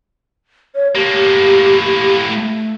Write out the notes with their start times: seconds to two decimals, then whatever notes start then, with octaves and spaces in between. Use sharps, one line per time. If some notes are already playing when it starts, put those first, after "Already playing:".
0.75 C#5
0.95 A2 A#3 G4
2.26 A3